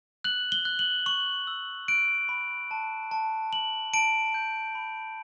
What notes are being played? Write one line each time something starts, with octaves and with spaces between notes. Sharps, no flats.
F#6 F#7
G7
F#6
F#7
C#6 F#7
E6
F#6 D7
B5
A5
A5
A5 F#7
A5 D7
G6
B5